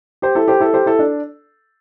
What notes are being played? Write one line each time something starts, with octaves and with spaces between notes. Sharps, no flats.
G4 C5
E4 A4
G4 C5
E4 A4
G4 C5
E4 A4
D4